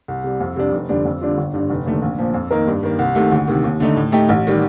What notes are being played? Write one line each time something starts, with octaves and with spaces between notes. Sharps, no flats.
C2
C3 G3
F2
C3 G3 D4
F1
F2 D3 G3 D4
F2
D3 G3 D4 F4
G1
G2 D3
F1
D#2 D3 A3
A#1
A#2 F3
F2
D#3 A#3 D#4 A#4
G2
D#3 A#3
C2
C3 D#3 A3
D2
C3 D#3
D#2
D3 A3 D#4
A2
A3 D#4 G4
A1
D#3 G3